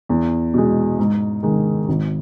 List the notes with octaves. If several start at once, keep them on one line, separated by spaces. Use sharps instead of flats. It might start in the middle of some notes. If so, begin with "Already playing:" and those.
E2
B2 G#3
G#2
D#3 G#3
G#1